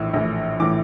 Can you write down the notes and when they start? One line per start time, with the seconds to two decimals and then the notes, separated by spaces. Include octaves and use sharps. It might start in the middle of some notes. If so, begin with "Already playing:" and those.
Already playing: A#1 A2 E3 E6
0.13 A#1 A2 E3
0.60 A2 E3 D6